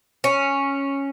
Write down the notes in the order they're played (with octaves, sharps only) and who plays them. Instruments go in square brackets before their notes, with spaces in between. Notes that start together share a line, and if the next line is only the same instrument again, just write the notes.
[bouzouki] C#4